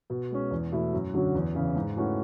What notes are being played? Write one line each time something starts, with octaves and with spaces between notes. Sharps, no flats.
B2
G#3 C#4
E2
B2 A3 E4
F#2
D3 F#3 C#4 F#4
E2
C#3 E3
G#2
E3 A3 C#4 F#4